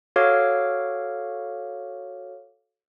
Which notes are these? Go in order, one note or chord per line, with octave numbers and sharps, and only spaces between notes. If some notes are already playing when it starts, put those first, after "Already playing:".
F#4 A4 C#5 F5 D6 F6